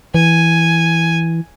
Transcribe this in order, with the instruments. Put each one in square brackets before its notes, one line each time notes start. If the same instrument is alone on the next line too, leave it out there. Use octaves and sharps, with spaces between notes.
[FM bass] E3 [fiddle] G#5